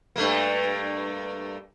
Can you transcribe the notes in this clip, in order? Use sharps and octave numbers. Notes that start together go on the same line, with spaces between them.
G2 A3 A#3